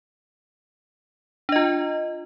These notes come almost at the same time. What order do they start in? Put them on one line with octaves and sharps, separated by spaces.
D4 D#5 F4